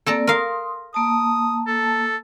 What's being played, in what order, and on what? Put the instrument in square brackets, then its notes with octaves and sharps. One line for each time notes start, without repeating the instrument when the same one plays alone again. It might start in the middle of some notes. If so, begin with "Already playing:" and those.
[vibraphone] A#3 C4 D5 [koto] A4 A5 A#5
[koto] A#4 F5 [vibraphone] C6 D#6
[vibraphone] A#3 A5 [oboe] D#6
[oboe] A4